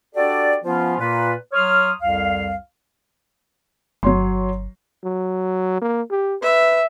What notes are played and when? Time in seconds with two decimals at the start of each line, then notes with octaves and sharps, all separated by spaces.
0.15 D4 F#4 G4 A4 D5
0.64 F3 B3 C#4 F4
0.99 A#2 A#3 F4 B4
1.53 F#3 C#5 C6 D#6 F6
2.00 C2 F2 F5
4.03 G1 F#3 C#5 C6
5.04 F#3
5.82 A#3
6.11 G4
6.42 B4 E5